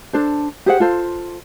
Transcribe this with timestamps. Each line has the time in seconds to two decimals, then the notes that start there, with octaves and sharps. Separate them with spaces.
0.13 D4 A4 C5
0.66 G4 G#4 C5 F#5
0.80 F4 A4 C5